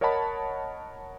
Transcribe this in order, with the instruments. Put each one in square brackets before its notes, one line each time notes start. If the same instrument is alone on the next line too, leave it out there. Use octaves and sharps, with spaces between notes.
[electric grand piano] A#4 C#5 D#5 F#5 A5 B5